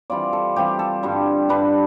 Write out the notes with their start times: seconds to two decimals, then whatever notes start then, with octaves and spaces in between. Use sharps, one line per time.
0.10 E3 G3 C4 F4 D5
0.33 A4
0.56 E3 G3 C4 F4 G4
0.79 A4
1.03 G2 D3 G3 D4
1.49 G2 D3 G3 D4 B4